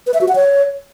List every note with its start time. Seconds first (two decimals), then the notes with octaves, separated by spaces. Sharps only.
0.07 B4
0.14 E5
0.21 F#4
0.28 F#5
0.35 C#5